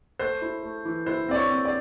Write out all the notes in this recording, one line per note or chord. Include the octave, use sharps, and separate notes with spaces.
A3 C5
E4
A3
E3
E4 C5
C4 D5
C#5
C4
D5